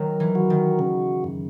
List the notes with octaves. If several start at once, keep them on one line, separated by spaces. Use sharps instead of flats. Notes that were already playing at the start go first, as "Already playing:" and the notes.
Already playing: D#3 F#3 A#4
E3
F#4
D#3
C#3
F#2